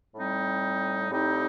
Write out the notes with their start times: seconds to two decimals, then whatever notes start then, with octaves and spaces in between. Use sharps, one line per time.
0.15 A2 G3 C4 D#4
1.10 A2 G3 C4 D#4